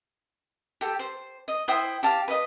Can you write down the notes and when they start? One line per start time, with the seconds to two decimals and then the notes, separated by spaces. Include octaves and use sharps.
0.81 G4 A4
0.99 C5
1.48 D#5
1.68 E4 C5 G5 D#6
2.03 G4 F5 A5
2.28 B4 D#5